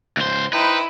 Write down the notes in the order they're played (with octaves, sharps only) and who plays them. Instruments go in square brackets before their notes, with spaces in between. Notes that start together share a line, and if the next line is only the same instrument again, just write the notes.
[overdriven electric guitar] C#2 C5
[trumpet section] D#4 C5 G5 [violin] E4 [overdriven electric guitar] B4